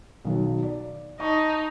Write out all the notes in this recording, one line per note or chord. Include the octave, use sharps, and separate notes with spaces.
B1 D#3 F#3
D5
D#4 A5 C#6